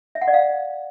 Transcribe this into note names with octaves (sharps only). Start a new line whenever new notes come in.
E5
F#5
D5
F5